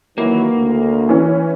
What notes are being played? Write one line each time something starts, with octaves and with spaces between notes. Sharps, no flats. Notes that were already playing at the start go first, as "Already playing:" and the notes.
D#2 E3 F#3 A#3
D2
E3 C#4